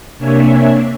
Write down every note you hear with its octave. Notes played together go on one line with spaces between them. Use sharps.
C3 A#3 D4 C#5 E5 G#5